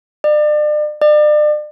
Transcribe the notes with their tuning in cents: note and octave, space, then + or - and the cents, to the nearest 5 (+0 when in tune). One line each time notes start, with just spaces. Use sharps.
D5 +40
D5 +40